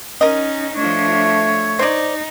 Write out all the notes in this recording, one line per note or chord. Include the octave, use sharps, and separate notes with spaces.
C#4 D#4 A#4 D#5
F3 A3 D4 C#5
D#4 C5 D5